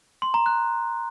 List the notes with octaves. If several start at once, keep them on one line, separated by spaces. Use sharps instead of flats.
C6
A#5
F#6